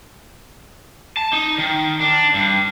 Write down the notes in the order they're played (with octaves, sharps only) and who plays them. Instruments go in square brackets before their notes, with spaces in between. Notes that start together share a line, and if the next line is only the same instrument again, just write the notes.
[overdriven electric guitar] A5
D#4
D#3
D4
G2